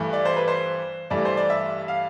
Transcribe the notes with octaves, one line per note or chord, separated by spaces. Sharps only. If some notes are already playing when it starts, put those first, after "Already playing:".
Already playing: G2 E3 A3
D5
C5
B4
C5
G2 E3 A3 D5
C5
D5
E5
F5